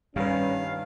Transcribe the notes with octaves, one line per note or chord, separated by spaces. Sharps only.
G2 D#3 G3 C#4 B4 F5